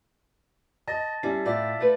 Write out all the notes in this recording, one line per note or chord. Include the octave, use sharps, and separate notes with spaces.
D#5 A5 A6 A#6
G3 C#4 E4 C7
A2 F4 D5 E5
A3 B4